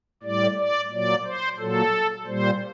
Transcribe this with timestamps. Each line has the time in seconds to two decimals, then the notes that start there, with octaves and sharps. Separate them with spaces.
0.23 A2 G3 D5
0.57 D5
0.90 A#2 F#3 D5
1.25 C5
1.58 A#2 F#3 A4
2.26 A#2 G3 C5